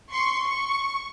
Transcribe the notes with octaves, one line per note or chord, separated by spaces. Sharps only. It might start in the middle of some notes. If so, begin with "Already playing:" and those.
C6 C#6
C#6